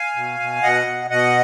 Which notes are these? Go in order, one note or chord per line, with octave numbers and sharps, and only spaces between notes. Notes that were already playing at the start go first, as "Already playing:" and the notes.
Already playing: F5 G#5
B2
B2
B2 D#5 F#5
B2
B2 D#5 F#5